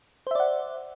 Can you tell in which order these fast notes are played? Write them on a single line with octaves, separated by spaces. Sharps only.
C5 E5 D5 F#5